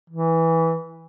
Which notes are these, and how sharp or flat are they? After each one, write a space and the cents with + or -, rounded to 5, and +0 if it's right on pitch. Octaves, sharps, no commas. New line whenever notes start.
E3 -10